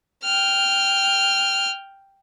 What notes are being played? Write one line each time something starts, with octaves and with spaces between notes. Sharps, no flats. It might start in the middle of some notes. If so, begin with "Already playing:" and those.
G5 F6